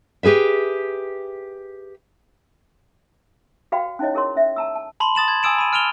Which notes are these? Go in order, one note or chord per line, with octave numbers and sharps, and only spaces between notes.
G4 G#4 B4 E5
F#4 B4 D5 F5 G5 B5
C#4 D#4 E4 C#5 D#5
E4 G#4 A#4 C#5 C6
C#4 E5
A5 A#5 E6
A5
A5 B5 C6 F#7
D#6 A6 E7 F#7
G#6
G#5 D#6 E6 D7 E7
B5 D#7
F6 D7 D#7 F7 G7